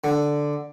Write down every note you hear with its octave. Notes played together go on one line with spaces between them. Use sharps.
D3